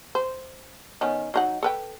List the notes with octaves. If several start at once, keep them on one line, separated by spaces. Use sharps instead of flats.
C5
D#3 B3 C#4
F#3 D#4 F#5
A4 B4 G5